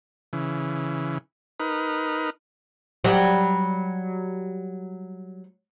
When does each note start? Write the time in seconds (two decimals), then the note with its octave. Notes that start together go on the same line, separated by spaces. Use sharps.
0.33 C#3 E3
1.60 D#4 A#4 B4
3.04 F#3 G3